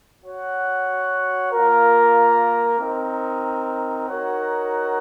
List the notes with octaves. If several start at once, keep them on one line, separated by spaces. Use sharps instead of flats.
F#4 C#5 F#5
A#3 F4 A#4
C4 D#4 A#4
D#4 F#4 A#4 C#5 F#5